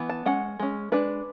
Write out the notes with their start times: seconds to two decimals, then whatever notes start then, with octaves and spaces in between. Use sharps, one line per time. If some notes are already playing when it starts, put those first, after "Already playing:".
Already playing: E3 B3
0.09 A5
0.26 G#3 C#4 F#5
0.59 G#3 C#4
0.92 G#3 D4 B4